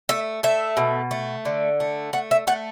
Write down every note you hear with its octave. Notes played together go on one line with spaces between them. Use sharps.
A3 E5
A3 E5
B2
A3
D3
A3
A3 F#5
E5
A3 F#5